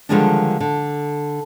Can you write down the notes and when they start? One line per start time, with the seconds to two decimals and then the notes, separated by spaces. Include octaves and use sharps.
0.09 D3 D#3 F3 G3 G#3 D4
0.60 D3